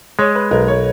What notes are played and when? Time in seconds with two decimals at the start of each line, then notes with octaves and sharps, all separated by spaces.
0.19 G#3 C#5
0.35 B4
0.51 B1 A#4
0.68 C#5